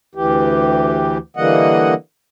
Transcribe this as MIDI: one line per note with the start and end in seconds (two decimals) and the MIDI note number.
0.15 1.18 38
0.15 1.18 52
0.15 1.18 67
1.37 1.94 50
1.37 1.94 52
1.37 1.94 55
1.37 1.94 58
1.37 1.94 75
1.37 1.94 78